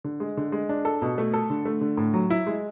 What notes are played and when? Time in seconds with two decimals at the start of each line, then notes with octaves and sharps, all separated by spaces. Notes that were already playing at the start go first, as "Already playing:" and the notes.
0.04 D3
0.20 G#3
0.37 D3
0.52 G#3
0.69 D4
0.85 A4
1.02 B2
1.18 A3
1.34 A4
1.50 D3
1.65 A3
1.81 D3
1.97 A2
2.14 F#3
2.30 E4
2.47 G#3